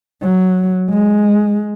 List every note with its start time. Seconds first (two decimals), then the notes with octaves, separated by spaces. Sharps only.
0.22 F#3
0.90 G#3